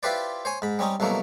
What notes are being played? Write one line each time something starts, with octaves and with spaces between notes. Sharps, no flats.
E4 F4 G4 B4 C5 D5
C5 C#5 G#5
G#2 B5
G3 C4 C#4 D#4
C2 B2 F#3 A3 A#3